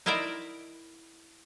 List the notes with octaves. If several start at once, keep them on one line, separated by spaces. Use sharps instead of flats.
D#4 E4 A#4 C5 D5 E5